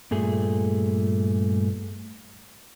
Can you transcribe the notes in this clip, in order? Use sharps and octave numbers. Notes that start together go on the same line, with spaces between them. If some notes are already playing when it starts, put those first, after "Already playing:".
G2 A#2 A3 G#4